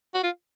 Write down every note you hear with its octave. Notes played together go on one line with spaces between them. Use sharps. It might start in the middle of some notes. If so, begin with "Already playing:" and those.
F#4
F4